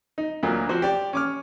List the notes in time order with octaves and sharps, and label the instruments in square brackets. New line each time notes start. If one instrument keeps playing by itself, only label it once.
[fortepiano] D#4
D2 A#2 F#3 A#3
F3 C4 F#4 C5
G4 D5 D6
C#4 D6 F6